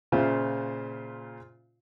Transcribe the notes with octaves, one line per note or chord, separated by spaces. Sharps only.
A#2 C#3 F4 C5 E5